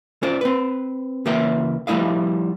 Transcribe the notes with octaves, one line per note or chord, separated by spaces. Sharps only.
C#4 F4 C5 D5
C4 B4
C#2 E3 A#3 B4 E5 G5
F3 G3 A3 E4 D#5 F5